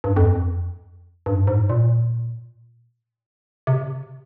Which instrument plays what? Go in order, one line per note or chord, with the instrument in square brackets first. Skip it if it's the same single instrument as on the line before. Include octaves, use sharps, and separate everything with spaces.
[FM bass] G2
F2
G2
G#2
A#2
C3